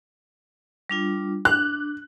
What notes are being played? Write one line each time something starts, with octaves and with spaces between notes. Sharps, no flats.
G3 D4 F4
D4 F#6